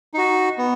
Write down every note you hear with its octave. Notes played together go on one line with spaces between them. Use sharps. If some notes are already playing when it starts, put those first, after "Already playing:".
D#4 F#4
B3